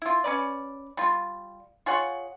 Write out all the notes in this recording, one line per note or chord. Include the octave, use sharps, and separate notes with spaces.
E4 F4
C#4 B4 D5
G3 F4
F4 G#4 C#5 F#5